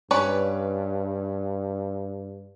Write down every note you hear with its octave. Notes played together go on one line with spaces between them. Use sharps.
G2 C#4 B4 D5